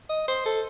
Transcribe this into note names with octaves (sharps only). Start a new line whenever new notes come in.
D#5
C5
A4